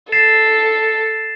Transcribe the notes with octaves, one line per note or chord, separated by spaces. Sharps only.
A4 A6 C7 E7